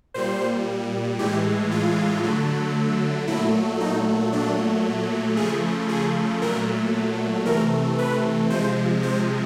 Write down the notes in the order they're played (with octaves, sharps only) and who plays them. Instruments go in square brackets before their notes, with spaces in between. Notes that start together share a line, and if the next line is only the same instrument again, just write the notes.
[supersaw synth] A#2 G3 C5
A2 E3 G#3 G4
F4
D3 F#3 A3
A#2 F#3 A3 E4
D#4
A#2 F#3 A3 D4
C#3 F3 A3 G#4
G#4
A#2 F#3 A3 A#4
C3 E3 A3 A#4
B4
C3 F3 G#3 C5
C5